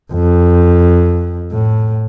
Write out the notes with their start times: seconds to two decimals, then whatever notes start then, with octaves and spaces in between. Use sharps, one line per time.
0.13 F2
1.52 A2